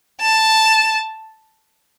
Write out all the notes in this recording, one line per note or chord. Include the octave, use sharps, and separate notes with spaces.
A5